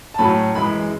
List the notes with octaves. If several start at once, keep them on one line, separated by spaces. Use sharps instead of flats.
A5
A2 F#3 A3 C#4 B5
F#2 E3 G#3 B5